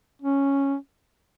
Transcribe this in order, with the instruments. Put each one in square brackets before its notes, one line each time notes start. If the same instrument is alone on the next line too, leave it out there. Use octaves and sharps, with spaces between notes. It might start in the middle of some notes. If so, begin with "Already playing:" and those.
[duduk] C#4